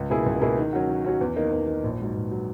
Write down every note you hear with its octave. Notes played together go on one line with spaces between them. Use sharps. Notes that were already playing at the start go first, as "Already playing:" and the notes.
Already playing: C#2
B2 A#3 E4 G#4
C#2
B2 A#3 E4 G#4
D#3
F#3 C#4 F#4
D#3
F#3 C#4 F#4
E2
D#3 A#3 D#4
E2
D#3 A#3 D#4
A#1
G#2 F#3
A#1
F#3